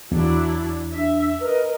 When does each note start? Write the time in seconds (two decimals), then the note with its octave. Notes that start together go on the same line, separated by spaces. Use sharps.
0.12 E2 F#3 D4 E4
0.93 D4 E5
1.41 A#4 B4 D#5